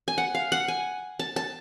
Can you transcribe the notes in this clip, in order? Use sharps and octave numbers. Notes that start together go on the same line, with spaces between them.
G#5
F#5
F5
F#5
G#5
A5
A5